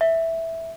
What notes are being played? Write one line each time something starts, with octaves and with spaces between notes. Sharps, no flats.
E5